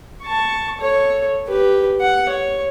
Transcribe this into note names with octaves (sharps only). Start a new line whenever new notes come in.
A5 C#6
A4 C#5
G4 B4
F#5
C#5